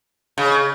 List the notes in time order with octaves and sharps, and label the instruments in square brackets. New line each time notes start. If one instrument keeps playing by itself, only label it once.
[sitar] C#3